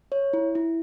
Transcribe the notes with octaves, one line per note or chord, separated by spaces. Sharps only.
C#5
E4
E4